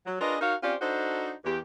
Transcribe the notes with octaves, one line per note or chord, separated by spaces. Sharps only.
F#3
D4 F4 G#4 A#4 B4 D#5
D#4 F#4 A#4 C#5 F5
C4 C#4 F4 G4 C5 D5
D4 D#4 F#4 A4 C5
E2 G4